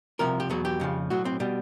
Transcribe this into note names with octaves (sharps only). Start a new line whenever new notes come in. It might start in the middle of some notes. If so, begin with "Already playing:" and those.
C2 C3 F3 A#4
G4
E2 B2 F#3 G#4
G4
F2 C#3 F3
B1 A2 F#3 F#4
C4
B2 G3